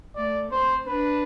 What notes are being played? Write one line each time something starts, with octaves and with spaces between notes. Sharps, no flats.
A3 D5
C4 C5
D4 B4